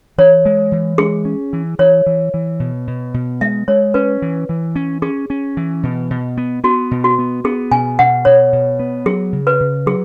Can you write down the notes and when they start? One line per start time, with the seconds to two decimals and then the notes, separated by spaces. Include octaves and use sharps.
0.18 E3 C#5
0.46 G#3
0.72 E3
0.98 G#3 G#4
1.25 C#4
1.53 E3
1.79 E3 C#5
2.06 E3
2.34 E3
2.60 B2
2.87 B2
3.14 B2
3.41 G#3 E5
3.68 G#3 C#5
3.94 C#4 B4
4.22 E3
4.49 E3
4.76 C#4
5.02 C#4 G#4
5.30 C#4
5.57 E3
5.83 B2
6.10 B2
6.37 B3
6.64 B3 F#4
6.91 B2
7.04 F#4
7.18 B3
7.44 B3 G#4
7.71 B2 G#5
7.99 B2 F#5
8.25 B2 C#5
8.53 B2
8.79 B3
9.06 F#3 G#4
9.33 C#3
9.47 B4
9.60 C#3
9.86 F#3 G#4